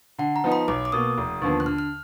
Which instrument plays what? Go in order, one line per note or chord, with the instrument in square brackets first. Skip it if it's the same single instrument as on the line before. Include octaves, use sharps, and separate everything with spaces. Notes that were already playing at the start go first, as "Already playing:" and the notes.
[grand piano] D3 [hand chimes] F#5
[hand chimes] A#5
[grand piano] F3 B3 D#4
[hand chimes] B5
[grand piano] B1 [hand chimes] D6
[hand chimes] D6
[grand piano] B2 A#3 [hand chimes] D#6
[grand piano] F1
D#2 D3 F3 B3
[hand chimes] F#6
[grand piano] D3 [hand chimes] F6
[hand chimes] F6